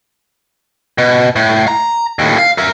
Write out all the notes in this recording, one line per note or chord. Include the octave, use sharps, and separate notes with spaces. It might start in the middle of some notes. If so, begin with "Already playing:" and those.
B2
A2
A#5
D#2 A2
F5
A#4 E5